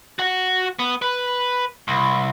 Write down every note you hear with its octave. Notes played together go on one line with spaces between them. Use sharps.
F#4 F#5
B3
B4
C2